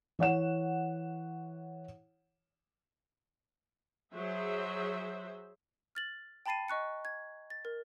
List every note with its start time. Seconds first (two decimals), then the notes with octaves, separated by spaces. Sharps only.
0.19 E3 C#5 F#5 E7
4.14 F#3 G#4 C5 E5
5.95 F6 A6 F#7
6.46 G5 A5 B5 A6 C7 D#7
6.68 D#5 C#6 F#6 C#7
7.05 G#6
7.50 A6
7.65 A#4